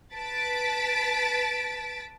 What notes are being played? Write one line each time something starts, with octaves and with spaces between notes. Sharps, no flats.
B4 A5 A6 B6 D7